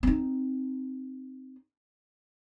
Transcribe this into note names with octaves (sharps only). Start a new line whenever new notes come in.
C4 D#4